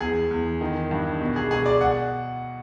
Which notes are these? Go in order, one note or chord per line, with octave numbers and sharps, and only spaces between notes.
E2 G#4
E2
D#3
G2
B2
G#4
B2 G#4
D5
F#5